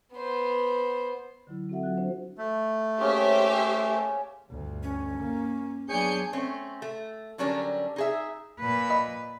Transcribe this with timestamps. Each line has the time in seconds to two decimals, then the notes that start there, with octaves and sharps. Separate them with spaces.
0.14 B3 C5
1.47 D3 F#3 E4
1.69 C4 F#4 A4 E5 F#5
1.83 F#3 F4 F#4 F#6
1.97 D4 C5
2.38 A3
3.01 A#3 C#4 G4 G#4 C5 E5
4.49 G1 D2
4.83 C#4
5.19 A#3
5.89 F#3 B3 D4 G#4 C#5 G#5 G6 C#7
6.33 A3 C4 C#4
6.82 A3
7.38 D3 F#3 G3 C#4 D4 A#4
7.96 D#4 G#4 E5
8.60 A#2 B4
8.90 D#5 B5